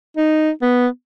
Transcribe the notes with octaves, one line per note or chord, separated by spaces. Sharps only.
D#4
B3